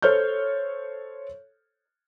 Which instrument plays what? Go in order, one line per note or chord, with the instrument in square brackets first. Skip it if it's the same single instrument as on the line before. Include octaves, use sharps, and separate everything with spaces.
[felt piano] A4 C5 C#5 F6 G6